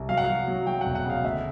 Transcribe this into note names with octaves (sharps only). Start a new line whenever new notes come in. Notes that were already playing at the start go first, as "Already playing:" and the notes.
Already playing: C2
F#3 F5
F#5
F#3 F5
F#3
F#3 G5
E1 F#5
F#5
C#3 F5
D2 E5